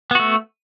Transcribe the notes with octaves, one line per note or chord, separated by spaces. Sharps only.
A3 B3 F#4